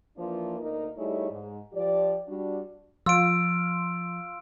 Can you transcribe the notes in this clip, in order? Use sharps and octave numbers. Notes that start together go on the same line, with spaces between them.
E3 F3 A#3 D4 F4
D2 A#3 D#4 A#4
G3 A3 D#4 E4 G#4 C#5
G#2
F3 G4 D5
G3 D4 F#4
F3 F4 E6 D7